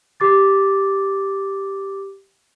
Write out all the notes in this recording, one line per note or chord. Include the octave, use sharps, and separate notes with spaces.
G4 D6 A6